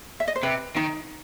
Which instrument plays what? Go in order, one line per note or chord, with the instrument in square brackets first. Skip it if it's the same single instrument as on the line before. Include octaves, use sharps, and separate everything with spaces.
[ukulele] E5
D#5
C5
[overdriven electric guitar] C3 [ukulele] B4
[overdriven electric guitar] D#3 [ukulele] D#4